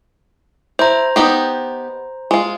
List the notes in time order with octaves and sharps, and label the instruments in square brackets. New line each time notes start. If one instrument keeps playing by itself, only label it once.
[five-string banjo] E4 [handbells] C5 A#5
[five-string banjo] B3 D#4 G4
G#3 F4